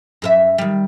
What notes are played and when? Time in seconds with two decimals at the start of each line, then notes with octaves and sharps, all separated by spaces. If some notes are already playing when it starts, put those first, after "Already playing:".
0.22 F#2 A#4 E5
0.58 D#3 G3